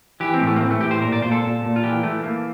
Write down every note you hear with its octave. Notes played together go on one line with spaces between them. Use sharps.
E3 G4
C4
A2
A3
A#3
E3 C4
A3
A2 G4
C5
A#2 A#4
D5
A#2 C5
A4
A#2
A#2
F4
E3 G4
E3 A3
E3 A#3